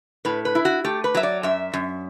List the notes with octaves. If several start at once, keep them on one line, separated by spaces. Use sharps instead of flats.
A2 B4
B4
E4
F#4
A3 G4
B4
F#3 E5
D5
F#2 E5
F#2